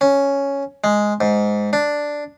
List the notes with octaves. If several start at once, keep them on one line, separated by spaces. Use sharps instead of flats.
C#4
G#3
G#2
D4